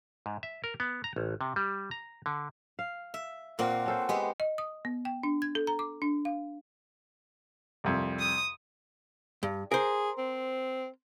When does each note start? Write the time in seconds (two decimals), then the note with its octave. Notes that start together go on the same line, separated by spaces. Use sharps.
0.26 G#2
0.43 E5
0.64 A#4
0.80 B3
1.04 A#5
1.16 A1
1.41 C3
1.56 G3
1.91 A#5
2.26 D3
2.79 F5
3.14 E5
3.59 A#2 A#3 C4 F#5
3.86 C#4 A4 C5
4.09 G#3 B3 G4 C5
4.40 D#5
4.58 D#6
4.85 B3
5.05 G5
5.23 D4
5.42 G#6
5.55 A4
5.67 A#5
5.79 D6
6.02 D4
6.25 F5
7.84 C2 F2
8.19 D#6
9.43 G2
9.72 G#4 A#4 C5
10.18 C4